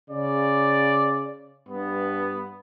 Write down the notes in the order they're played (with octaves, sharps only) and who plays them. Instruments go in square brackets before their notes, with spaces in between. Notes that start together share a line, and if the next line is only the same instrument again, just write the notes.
[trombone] C#3 [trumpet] D5
[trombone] G2 [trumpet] B3